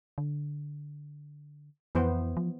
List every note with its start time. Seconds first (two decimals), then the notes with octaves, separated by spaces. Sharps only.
0.18 D3
1.95 F2 E3 B3 C5
2.37 F3